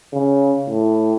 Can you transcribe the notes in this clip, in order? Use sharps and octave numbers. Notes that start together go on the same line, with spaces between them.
C#3
A2